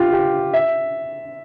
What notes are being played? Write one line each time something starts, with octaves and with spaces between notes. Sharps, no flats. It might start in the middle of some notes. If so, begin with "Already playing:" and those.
Already playing: F4 G4
G4
E5